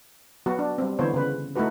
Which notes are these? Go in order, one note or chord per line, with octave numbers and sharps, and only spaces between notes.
F#3 B3 F#4
D4
G3 C4
D3 E3 B3 C5 C#5
C#3 B4
A3 D#4 E4 F#4 B4